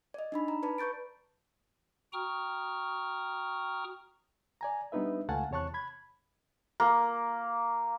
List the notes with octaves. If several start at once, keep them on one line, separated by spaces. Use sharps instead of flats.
D5 D#5
D4 D#4 B5
A#5
B4 D5 A5 B5
B4 C#6 G6 A6 D7
F#4 G5 A#5 C#6 D#6 F6
D5 G#5 A#5
G3 B3 D4 D#4 B4 E5
C#2 A3 F5 F#5 G#5 A5
E2 C3 C#5 A5 C#6 F#6
B5 G#6
A#3